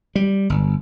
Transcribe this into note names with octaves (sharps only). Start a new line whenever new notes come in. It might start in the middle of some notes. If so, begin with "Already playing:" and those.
G3
G1